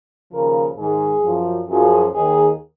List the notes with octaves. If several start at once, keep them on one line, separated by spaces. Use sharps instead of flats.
D#2 C#3 F3 A#4
G#2 D#3 G#4
F#2 F3
F#2 F3 G#4
D#2 D#3 G#4